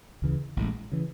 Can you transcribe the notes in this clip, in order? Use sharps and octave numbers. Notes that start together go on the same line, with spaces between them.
D2 C#3 E3
A1 A2 E3 G#3
C#3 E3